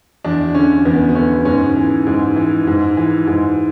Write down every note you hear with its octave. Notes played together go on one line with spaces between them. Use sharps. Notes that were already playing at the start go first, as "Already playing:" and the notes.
E2 D4
D3 C#4
E2 B3
B3
D3 C#4
G#2 C#4
E3
G#2
E3
G#2
E3
G#2